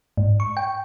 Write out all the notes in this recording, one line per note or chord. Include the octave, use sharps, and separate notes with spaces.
G#2
C#6
G5